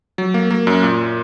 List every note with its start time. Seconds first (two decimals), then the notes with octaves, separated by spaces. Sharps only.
0.18 F#3
0.34 A#3
0.51 A#3
0.67 F#2
0.83 A#2